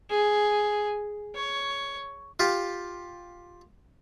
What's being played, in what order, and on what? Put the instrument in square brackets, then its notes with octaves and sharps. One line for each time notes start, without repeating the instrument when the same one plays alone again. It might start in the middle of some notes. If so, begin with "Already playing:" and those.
[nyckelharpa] G#4
C#5
[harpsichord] F4 G4